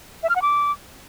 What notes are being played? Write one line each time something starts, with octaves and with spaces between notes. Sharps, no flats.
E5
F6
F#5
D6